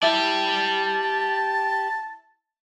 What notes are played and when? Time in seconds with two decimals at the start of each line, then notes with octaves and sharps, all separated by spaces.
0.02 E4 G4 D5 A5